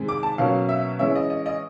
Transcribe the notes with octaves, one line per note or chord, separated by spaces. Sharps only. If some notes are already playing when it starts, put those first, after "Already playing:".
Already playing: C3 D#3 G#3
D6
A5
B2 F#3 A#3 C#4 F5
E5
E3 G#3 C#4 E5
D#5
D#5
D#5